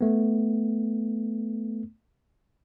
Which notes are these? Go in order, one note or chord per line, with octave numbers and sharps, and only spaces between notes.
A3 B3